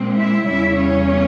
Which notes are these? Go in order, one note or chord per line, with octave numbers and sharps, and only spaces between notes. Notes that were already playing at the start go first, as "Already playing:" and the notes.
Already playing: A#2 G#3 C4
E4 E5
E2 C#3 G3 C#4 E4 E5
C#4 C#5